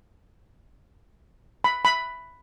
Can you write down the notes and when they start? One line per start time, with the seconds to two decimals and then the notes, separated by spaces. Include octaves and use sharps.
1.64 B5
1.85 B5